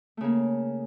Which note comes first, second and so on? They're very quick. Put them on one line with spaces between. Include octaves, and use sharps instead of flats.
A3 C#3 A#3